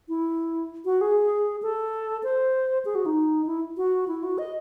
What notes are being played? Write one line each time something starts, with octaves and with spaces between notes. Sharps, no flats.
E4
F#4
G#4
A4
C5
G#4
F#4
D#4
E4
F#4
E4
F#4
D#5